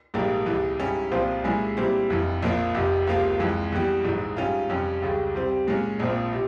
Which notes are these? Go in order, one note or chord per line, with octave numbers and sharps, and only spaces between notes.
A#1 G#2 G3 A#3
C#2 C3 E3
G#2 G3 C#4 E4
C2 A#2 F3 C4 F4
A#2 G#3 C#4 E4 G#4
A#2 G3 C4 E4
F1 F2 E3
A#1 A#2 F3 A#3
F1 F2 C3
C#2 C3 F3 A#3 F4
F2 E3 G#3
E2 E3 G3
A#1 G#2 E3
G#2 G3 C#4 F4
F2 C3 G3 C#4
C#2 C#3 G3
C3 G3 C4
A#2 G#3 C#4
A#1 A#2 F3 C4
C3